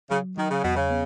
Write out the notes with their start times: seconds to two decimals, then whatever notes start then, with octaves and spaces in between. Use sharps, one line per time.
0.11 C#3 F#3
0.38 D#3 F#3
0.51 C#3
0.64 E2 B2
0.76 C#3
0.90 B3